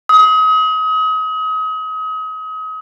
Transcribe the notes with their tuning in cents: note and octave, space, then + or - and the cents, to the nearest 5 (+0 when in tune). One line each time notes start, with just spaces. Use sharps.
D#6 +35